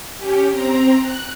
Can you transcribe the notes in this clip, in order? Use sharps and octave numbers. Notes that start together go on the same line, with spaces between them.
C#4 G4
C4 A#5
F#6